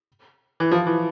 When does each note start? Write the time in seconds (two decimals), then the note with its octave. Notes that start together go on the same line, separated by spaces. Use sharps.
0.60 E3
0.72 F3
0.87 E3